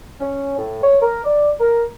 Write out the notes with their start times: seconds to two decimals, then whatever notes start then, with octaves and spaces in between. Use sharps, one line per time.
0.20 C#4
0.58 A2
0.84 C#5
1.01 A#4
1.24 D5
1.60 A#4